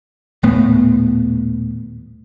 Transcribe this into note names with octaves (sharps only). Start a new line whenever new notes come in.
D#1 A2 B3